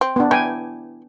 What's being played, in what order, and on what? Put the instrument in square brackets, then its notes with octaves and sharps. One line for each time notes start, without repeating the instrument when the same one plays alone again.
[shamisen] C4
[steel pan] B3 D4
[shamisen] E3 E4 [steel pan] G5 G#5